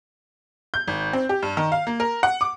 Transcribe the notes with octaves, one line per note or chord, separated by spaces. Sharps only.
G6
G#1
C4
G4
G2
D#3
F5
A#3
A#4
F#5
D6